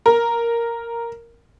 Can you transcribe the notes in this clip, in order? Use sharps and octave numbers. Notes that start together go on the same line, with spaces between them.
A#4